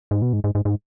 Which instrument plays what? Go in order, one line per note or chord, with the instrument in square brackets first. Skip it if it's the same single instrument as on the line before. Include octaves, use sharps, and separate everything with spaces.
[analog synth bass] G#2
B2
G#2
G#2
G#2
G#2